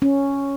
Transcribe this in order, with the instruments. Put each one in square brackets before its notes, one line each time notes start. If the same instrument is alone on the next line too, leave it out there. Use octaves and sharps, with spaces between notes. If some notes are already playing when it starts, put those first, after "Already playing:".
[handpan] C#4